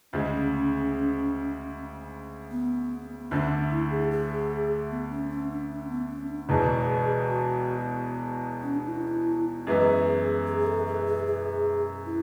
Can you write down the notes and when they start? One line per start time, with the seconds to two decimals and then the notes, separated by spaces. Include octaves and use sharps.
0.13 D2 C#3 G#3 C#4
2.51 B3
3.31 D2 D3 A3 C#4
3.71 E4
3.91 G#4
4.11 G#4
4.90 B3
5.10 C#4
5.30 C#4
5.50 D4
5.70 C#4
5.89 B3
6.09 C#4
6.29 D4
6.49 E1 E2 B2 G#4
7.29 F#4
8.62 C#4
8.75 D4
8.88 E4
9.67 F#2 E3 G#3 B3 G#4
10.47 G#4
10.58 G#4
10.67 A4
10.87 G#4
11.06 G#4
11.27 G#4
12.06 E4